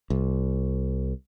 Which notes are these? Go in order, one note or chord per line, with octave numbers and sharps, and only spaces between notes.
C2